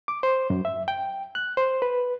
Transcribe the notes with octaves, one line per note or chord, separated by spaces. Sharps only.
D6
C5
F#2
E5
G5
F#6
C5
B4